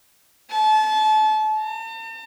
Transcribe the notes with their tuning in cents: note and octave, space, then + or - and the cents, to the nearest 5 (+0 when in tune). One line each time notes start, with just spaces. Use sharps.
A5 -30
A5 +45